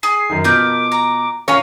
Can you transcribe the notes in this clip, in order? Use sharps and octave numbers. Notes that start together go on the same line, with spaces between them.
G#4 G#5 C7
F#2 D#3
B2 F3 A#4 B4 D6 G6
A#5
A#2 C#4 A#4 C#5 F5 G#5